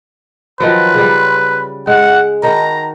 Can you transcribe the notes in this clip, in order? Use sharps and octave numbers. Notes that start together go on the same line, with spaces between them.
D#3 F3 F#3 B4
C#3 G3
G#3 F#5
D#3 F#4 A#5